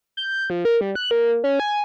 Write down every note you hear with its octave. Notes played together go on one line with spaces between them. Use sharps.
G6
F3
A#4
G3
F#6
A#3
C#4
G#5